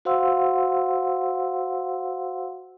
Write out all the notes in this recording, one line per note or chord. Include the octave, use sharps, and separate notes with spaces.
F#4 C5 F5 F#5 C6 E6